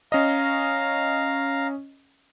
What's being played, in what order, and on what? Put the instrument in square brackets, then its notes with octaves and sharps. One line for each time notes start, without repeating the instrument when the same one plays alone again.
[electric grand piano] C#4 D#5 [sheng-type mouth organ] F5 A#5